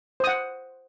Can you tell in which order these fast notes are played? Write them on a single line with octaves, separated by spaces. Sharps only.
C5 D#6 F#5